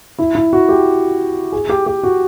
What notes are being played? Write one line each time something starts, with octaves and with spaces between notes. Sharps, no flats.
E4
E4
F#4
G4
G#4
G4
G4
F#4